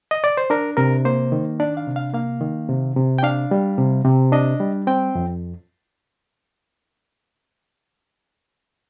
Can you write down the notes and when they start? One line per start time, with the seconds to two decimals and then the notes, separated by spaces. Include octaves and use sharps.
0.11 D#5
0.24 D5
0.37 C5
0.50 D4 A#4
0.77 C3 A#4
1.05 A#3 C5
1.32 D#3
1.60 D4 D5
1.77 F5
1.87 C3
1.96 F5
2.13 A#3 F5
2.41 D#3
2.69 C3
2.96 C3
3.18 G5
3.23 D4 F5
3.51 G3
3.78 C3
4.05 C3
4.32 D4 D#5
4.60 G3
4.87 C4 G5
5.15 F2